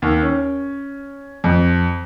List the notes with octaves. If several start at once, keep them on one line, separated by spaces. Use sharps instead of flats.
D#2
C#4
F2